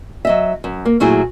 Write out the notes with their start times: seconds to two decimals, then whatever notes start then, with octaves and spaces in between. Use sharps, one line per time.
0.25 F#3 D#5 E5
0.64 F#2
0.85 A#3
1.00 A#2 F#3 A3 E4 G#4